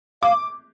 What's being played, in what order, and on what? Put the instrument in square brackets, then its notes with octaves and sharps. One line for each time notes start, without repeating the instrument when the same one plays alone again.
[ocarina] F5 [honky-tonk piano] D6